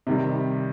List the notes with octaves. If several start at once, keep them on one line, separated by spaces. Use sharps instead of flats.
C3 D#3 G3